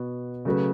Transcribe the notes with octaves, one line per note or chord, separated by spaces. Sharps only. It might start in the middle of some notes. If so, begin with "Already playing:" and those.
Already playing: B2 B3 F#4 B4
C#3 F#3 A3 F#4 B4